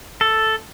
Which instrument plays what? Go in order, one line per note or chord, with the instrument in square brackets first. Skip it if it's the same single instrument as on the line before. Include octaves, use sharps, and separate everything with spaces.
[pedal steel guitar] A4